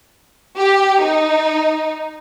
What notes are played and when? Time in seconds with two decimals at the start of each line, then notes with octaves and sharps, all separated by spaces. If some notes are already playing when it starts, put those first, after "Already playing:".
0.56 G4
1.01 D#4